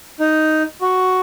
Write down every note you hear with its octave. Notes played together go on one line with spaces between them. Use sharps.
D#4
F#4